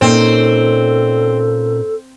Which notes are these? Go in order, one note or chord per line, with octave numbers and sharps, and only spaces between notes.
A#2 C4 C#4 D#4 A4